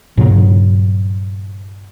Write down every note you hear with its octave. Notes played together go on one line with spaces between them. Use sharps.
G2 A#2 C#3 F#3